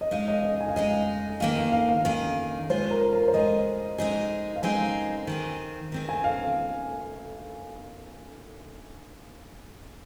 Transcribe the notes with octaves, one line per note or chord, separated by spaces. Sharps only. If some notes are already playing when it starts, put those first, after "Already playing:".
D#5
G#3 D#4 G#4 F5
D#5
D#5
G#5
F5
G#3 D#4 G#4 D#5
D#3 A#3 G#4 F5
F5
F5
F5
D#3 A#3 G#4 F5
G#3 F4 G#4 C5
A#4
A#4
C5
G#3 F4 G#4 D#5
G#3 C4 D#4 G#4 D#5
F5
G#3 C4 D#4 G#4 G#5
D#3 C4 G#4
D#3 C4 G#4
G#5
F5